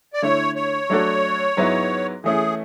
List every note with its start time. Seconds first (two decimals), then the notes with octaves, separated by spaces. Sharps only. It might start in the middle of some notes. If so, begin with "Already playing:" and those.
0.13 D5
0.22 D3 A3 E4 C#5
0.56 C#5
0.90 F#3 A3 D4 F#4 A4
1.57 G#2 F#3 B3 E4
2.24 E3 A3 C#4 E4 G#4